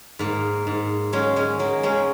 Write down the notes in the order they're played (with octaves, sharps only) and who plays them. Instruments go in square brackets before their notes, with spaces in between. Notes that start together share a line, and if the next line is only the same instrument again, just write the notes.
[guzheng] G#2 A#3
G#2
F#3 G#3 C#4
G#3 C#4
F#3 A#3
G#3 C#4